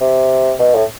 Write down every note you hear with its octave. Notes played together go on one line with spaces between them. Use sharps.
C3
B2
A2